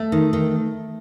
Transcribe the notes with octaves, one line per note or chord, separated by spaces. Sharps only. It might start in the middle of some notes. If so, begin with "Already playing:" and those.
Already playing: A3
D#3
D#3